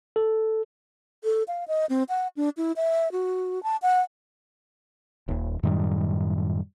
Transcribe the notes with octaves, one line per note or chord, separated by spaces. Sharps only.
A4
A4
F5
D#5
C4
F#5
D4
E4
E5
F#4
A5
F#5
D#1 D#2
F#2 A2 D#3 G3